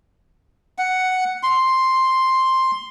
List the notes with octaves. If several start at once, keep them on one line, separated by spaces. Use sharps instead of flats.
F#5
C6